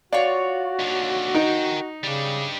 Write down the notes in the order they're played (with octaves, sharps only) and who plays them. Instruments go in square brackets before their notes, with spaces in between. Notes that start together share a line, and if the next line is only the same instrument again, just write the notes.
[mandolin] F4 C#5 [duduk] F#4 [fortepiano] D5
[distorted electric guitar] D#2 D3
[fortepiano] D#4 [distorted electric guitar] A#4 G5
[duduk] C#3 [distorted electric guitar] G3 D4